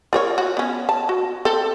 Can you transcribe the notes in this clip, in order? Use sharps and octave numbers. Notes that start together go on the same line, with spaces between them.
F4 A#4 C#5
F#4
B3 C#4
A5
F#4
C4 A4